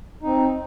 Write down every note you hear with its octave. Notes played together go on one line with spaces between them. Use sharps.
C4 D#4